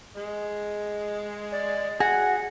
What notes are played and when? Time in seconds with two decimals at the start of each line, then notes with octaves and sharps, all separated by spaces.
0.16 G#3
1.52 D5
2.00 F#4 G#4 F#5